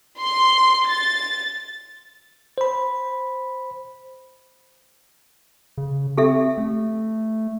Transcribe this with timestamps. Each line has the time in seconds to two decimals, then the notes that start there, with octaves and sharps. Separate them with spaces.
0.19 C6
0.87 A6
2.58 C5 B5
5.78 C#3
6.17 C4 G4 A4 E5
6.58 A3